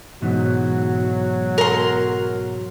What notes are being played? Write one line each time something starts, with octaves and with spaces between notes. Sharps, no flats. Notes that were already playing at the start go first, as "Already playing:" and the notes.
G#2 B2 E3 F#3
A#4 C6